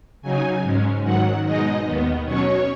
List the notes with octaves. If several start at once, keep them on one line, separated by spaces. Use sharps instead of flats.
C#3 F#3 D#4 G#5
G#2 G#3 C#4
G#2 D#3 F#3 F#5
B2 G#3 D#4 D#5
D#2 D#3 B3
B2 F#3 C#4 C#5